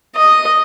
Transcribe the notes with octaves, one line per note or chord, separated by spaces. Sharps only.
D#5